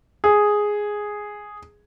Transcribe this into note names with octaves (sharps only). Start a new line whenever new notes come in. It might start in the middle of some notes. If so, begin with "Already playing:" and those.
G#4